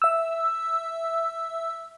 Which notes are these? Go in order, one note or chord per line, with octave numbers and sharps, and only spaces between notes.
E5 E6